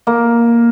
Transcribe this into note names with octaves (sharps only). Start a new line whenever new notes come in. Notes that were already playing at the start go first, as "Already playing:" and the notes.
A#3